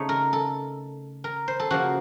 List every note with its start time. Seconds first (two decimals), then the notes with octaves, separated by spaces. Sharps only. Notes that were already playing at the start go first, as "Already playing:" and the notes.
Already playing: C#3 A3 D#4 C#5
0.09 A#4
0.33 A4
1.24 A#4
1.48 C5
1.60 A4
1.70 C#3 F3 A#3 F#4